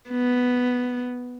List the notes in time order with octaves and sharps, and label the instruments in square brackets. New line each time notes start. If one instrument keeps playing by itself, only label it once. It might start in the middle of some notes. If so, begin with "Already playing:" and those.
[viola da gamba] B3